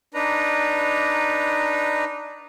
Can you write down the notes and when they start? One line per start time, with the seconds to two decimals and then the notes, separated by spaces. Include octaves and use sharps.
0.14 D4 D#4 B4 A#5